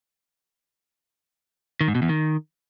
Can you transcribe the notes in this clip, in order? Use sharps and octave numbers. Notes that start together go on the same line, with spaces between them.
D#3
G#2
B2
E2
D#3